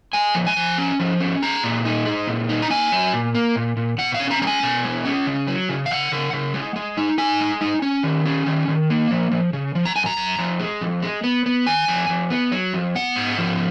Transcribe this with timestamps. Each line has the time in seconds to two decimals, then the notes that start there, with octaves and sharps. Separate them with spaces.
0.13 G#3 G#5
0.35 F3
0.47 G#5
0.56 F3
0.78 C#4
0.99 F3
1.20 C#4
1.43 G#3 A#5
1.63 A#2
1.85 D#4
2.06 G#3
2.27 A#2
2.49 D#4
2.62 A#5
2.70 A#3 G#5
2.92 F#3
3.13 A#2
3.35 A#3
3.56 A#2
3.77 A#2
3.98 B2 F#5
4.14 F5
4.20 C#4
4.31 A#5
4.41 G#3 A#5
4.47 G#5
4.63 B2
4.84 G#3
5.05 C#4
5.27 C#3
5.47 F#3
5.69 C#3
5.86 F5
5.91 C#3 F#5
6.12 C#3
6.33 C#3
6.54 G#3
6.76 G#3
6.97 D#4
7.18 D#4 G#5
7.40 G#3
7.61 D#4
7.82 C#4
8.03 D#3
8.26 C#4
8.46 D#3
8.68 D#3
8.90 A#3
9.11 F3
9.31 F3
9.53 C#3
9.75 F3
9.86 A#5
9.96 F#2 G#5
10.06 A#5
10.17 F#2
10.39 F2
10.60 G#3
10.81 F2
11.02 G#3
11.24 B3
11.46 B3
11.67 D#3 G#5
11.88 F2
12.09 F2
12.30 B3
12.52 F#3
12.74 F2
12.95 B3 F#5
13.16 G#2
13.38 F3